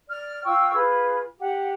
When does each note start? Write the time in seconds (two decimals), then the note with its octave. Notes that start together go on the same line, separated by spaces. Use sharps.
0.08 D5 F6
0.45 F4 G5 C#6 E6
0.74 F4 G#4 B4
1.38 G4 F#5